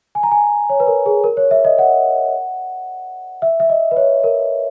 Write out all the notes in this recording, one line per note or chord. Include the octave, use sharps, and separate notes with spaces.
G#5
A#5
G#5
C#5
B4
A#4
G#4
A#4
C#5
E5
D#5
F#5
E5
E5
D#5
B4
C#5
A#4